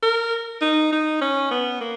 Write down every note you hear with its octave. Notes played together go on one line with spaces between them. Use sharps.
A#4
D#4
D#4
C#4
B3
A#3